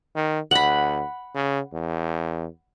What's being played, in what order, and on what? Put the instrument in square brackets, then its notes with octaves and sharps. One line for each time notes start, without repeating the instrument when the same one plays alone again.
[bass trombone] D#3
[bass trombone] D2 [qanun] F#5 B5
[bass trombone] C#3
E2